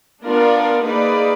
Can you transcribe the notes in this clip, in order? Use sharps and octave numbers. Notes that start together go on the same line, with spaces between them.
B3 D4 F4 A#4 D5
A#3 D#4 G#4 B4 D5